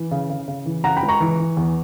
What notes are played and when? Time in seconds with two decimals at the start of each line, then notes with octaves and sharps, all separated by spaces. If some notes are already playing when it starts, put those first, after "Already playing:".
Already playing: E3
0.11 C#3
0.30 C#3
0.48 C#3
0.65 E3
0.84 C#3 F#5 A#5
0.97 G5 B5
1.03 C#2
1.09 A#5 C#6
1.21 E3
1.39 E3
1.57 E2